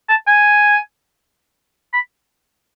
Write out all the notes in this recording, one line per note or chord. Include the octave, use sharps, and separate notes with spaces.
A5
G#5
B5